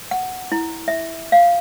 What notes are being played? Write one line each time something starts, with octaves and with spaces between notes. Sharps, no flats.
F#5
E4
E5
F5